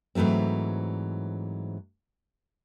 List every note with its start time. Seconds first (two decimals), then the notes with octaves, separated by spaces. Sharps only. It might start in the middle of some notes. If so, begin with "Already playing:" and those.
0.15 G#2 E3 F#3 A3 C4